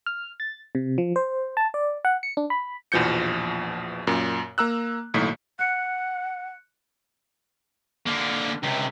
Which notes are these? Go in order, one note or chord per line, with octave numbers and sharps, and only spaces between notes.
F6
A6
C3
F3
C5
A5
D5
F#5
C#7
D4
B5
A#1 E2 B2 F3 G6 C#7
F#2 A#2
A#3 A#5 E6 F#6
B1 A2 D#3 A#3 B6
F#5 F#6 C#7
D3 A#3
C#2 C3